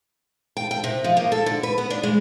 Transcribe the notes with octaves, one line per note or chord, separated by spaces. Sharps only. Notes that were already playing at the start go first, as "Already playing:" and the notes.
G5
G5
C3
F3
A#3
A4
D3
B4
B3
D4
G#3